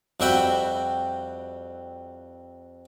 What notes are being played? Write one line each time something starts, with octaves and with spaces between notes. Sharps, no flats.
F2 G3 F#4 E5 G5 B5